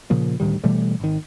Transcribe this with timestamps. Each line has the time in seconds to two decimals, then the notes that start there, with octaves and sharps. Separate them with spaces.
0.10 A#2 C#3 F3 A#3
0.40 D2 A2 D#3 G3
0.64 B2 E3 G3 A3
1.00 G#1 D#3